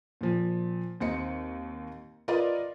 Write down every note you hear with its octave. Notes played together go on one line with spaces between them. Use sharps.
A#2 F3
D#2 C4 D#4 C#7
F4 A#4 B4 D5 D#5